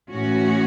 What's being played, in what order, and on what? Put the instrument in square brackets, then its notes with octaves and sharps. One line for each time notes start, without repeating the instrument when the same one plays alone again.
[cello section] A2 E3 C#4 F#4